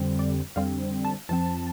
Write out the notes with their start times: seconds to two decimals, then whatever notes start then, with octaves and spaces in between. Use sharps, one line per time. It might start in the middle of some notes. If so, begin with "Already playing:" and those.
Already playing: F2 D3 G3 C4
0.19 D5
0.56 F2 D3 G3 C4 F5
1.05 A5
1.29 F2 F3 C4 A5